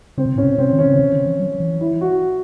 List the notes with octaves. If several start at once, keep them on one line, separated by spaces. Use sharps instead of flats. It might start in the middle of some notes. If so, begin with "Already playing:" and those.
C#3 C4
C3
A2 C#4
C3
C3 C4
D#3
C#4
C#3
C3
D#3
E3
F#3
E3
E4
F#4